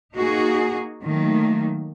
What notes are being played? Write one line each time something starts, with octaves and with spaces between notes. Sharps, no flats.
A#3 D#4 F#4 G#4
D#3 F#3 A3 A#3